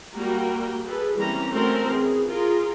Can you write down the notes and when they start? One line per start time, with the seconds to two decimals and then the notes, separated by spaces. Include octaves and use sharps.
0.14 G3 A#3 F#4 A#4 G5
0.83 G#4 A4 B4
1.16 E3 G3 A#3 C4 C#4 A#5
1.51 A3 C4 C#4 F#4 A4 A#4
1.86 E3 G#4
2.26 F4 G#4 A#4